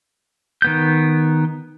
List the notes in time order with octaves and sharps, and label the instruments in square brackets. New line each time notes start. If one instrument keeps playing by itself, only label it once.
[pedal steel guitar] D#3 B3 G6